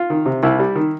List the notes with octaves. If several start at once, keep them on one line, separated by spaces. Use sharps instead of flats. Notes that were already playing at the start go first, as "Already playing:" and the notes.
Already playing: F4
D#3
C3
C2 E4
G3
D#3